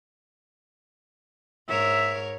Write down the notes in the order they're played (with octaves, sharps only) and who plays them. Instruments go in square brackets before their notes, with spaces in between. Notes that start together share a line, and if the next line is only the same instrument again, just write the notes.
[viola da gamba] G#2 A#4 C#5 [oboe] E5